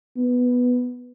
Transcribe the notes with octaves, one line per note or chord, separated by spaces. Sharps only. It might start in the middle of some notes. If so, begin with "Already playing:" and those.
B3